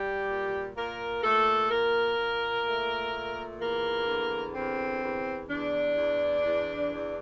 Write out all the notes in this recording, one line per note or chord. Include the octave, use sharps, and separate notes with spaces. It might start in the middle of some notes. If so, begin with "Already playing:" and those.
Already playing: G3 G4
A#2
A#2 A#3 A#4
A#2 A3 A4
A#2 A#3 A#4
A#2
A3
A#2
E2 A#3 A#4
D3
E2 C4
E2
E2 D4
E2
E2
E2